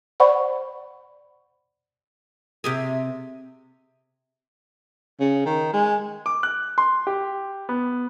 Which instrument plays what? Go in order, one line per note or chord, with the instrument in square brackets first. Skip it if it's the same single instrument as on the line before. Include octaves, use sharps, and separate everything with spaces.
[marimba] C5 D5 F#5 B5 C#6
[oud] C3 G4 G#4
[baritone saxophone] C#3
D#3
G#3
[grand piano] D6
F#6
C6
G4
B3